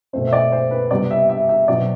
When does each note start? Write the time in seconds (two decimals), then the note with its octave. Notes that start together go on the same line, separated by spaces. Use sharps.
0.13 B2 A3 C4 C5
0.27 E5
0.33 D5
0.52 C5
0.71 B4
0.91 C3 G3 B3 D5
1.11 E5
1.29 E5
1.49 E5
1.68 B2 F#3 C4 D5